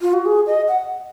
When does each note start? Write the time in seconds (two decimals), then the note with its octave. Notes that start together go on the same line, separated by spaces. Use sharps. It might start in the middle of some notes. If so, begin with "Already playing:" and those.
0.01 F4
0.13 F#4
0.26 G#4
0.47 D#5
0.68 F#5